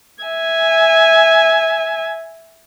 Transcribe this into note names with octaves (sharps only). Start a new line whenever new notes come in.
E5 G#5